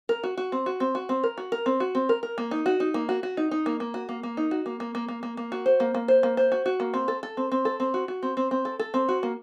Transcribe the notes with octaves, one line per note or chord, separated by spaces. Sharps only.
A#4
F#4
F#4
C4
F#4
C4
F#4
C4
A#4
F#4
A#4
C4
F#4
C4
A#4
A#4
A#3
D#4
F#4
D#4
A#3
F#4
F#4
D#4
D#4
A#3
A#3
F#4
A#3
A#3
D#4
F#4
A#3
A#3
A#3
A#3
A#3
A#3
F#4
C5
A#3
A#3
C5
A#3
C5
F#4
F#4
A#3
C4
A4
A4
C4
C4
A4
C4
F#4
F#4
C4
C4
C4
A4
A4
C4
F#4
A#3